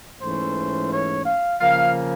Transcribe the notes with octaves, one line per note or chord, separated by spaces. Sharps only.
G#2 E3 A3 C#4 C5
C#5
F5
C#3 F3 A#3 F5